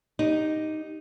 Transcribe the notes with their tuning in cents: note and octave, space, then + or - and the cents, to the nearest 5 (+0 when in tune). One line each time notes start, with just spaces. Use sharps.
D#4 +0 G4 +0